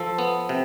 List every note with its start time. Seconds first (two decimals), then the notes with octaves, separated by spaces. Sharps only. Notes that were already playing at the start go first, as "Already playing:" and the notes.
Already playing: F3 A4
0.19 B3
0.49 C3